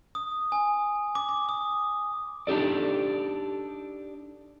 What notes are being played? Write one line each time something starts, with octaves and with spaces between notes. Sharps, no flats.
D#6
G#5
D6
D6
D#6
D4 D#4 G4 A4 D5